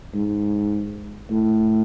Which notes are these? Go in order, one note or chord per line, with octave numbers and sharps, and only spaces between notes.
G#2
A2